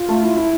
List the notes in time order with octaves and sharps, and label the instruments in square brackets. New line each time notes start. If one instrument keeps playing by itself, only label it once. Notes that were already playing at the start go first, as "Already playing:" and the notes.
Already playing: [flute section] F4
[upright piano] A3
E4
E4